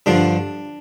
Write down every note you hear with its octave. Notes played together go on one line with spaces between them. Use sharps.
G2 D3 F3 D4